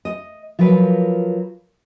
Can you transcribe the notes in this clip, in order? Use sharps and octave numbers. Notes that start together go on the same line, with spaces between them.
D#5
F3 F#3 F4 A#4 B4